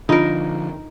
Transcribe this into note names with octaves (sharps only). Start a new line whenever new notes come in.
D3 F3 D4 D#4 F4 A#4